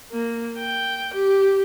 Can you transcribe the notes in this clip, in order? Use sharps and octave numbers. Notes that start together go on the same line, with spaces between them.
A#3
G5
G4